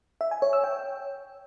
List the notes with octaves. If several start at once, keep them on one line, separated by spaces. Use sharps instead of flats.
E5
G#5
C#5
E6
G5